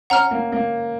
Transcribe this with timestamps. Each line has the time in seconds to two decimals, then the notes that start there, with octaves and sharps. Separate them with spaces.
0.10 C#4 F#5 A#5 F6
0.31 A#3
0.52 A#3